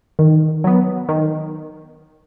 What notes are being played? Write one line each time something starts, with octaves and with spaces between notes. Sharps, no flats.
D#3
F#3 B3
D#3